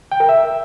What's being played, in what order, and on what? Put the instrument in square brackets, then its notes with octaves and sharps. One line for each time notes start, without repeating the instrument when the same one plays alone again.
[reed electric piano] G5
A#4
E5